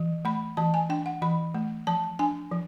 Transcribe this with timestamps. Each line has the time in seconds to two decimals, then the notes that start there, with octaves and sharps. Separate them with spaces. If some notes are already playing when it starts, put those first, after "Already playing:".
Already playing: E3
0.25 A3 B5
0.57 E3 A5
0.74 G#5
0.89 D4 G5
1.06 F#5
1.22 E3 B5
1.55 A3
1.87 F3 A5
2.19 D4 G#5
2.52 F3